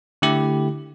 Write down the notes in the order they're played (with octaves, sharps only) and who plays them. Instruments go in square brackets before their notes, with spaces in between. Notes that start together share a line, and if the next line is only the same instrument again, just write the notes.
[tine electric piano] D3 A3 E4 G4